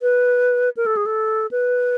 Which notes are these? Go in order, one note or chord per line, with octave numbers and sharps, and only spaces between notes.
B4
A#4
A4
G#4
A4
B4